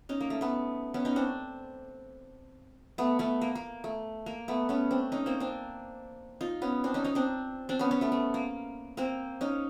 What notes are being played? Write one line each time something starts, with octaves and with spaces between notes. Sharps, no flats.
C#4 D#4
A#3
A3
A3 B3
B3 C#4
C#4 D#4
C4 D4
A3 B3
A3 B3
A#3
A#3
A3
A#3
A3 B3
B3 C#4
C4 D4
C#4 D#4
A#3 C4
C4 D4
D#4 F4
B3 C#4
C4 D4
C#4 D#4
C#4 D#4
C4 D4
C4 D4
B3 C#4
B3 C#4
A3 B3
A3
A#3
A#3 C4
C#4 D#4